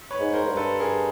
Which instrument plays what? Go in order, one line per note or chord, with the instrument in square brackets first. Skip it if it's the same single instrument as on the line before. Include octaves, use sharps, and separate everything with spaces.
[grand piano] B4 C#5
[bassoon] G#2
[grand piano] A#4 C5
[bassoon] G#2
G2
[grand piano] A4 B4
G#4 A#4